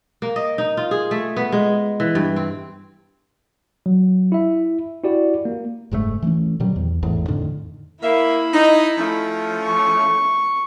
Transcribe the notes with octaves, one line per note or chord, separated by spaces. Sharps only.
A#3
D#5
D#4
F4
G#4
A3
B3
G#3
E3
G2
C4
F#3
E4 E5
E4 F#4 G4 D5
A#3
F#1 G#2 B2 A3
E3 A3 B3 C#4
A#2 D#3 F#3 G3
E2
G#1 E2 A2
F2 A2 D3 D#3
A#3 E4 E5 B5
D#4
F3 A3 C#4
C#6